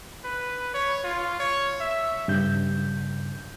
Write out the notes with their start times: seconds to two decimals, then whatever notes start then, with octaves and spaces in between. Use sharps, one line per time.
0.24 B4
0.74 C#5
1.04 F4
1.40 C#5
1.80 E5
2.28 G2 C#3 G6